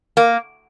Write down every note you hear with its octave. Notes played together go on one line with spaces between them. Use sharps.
A#3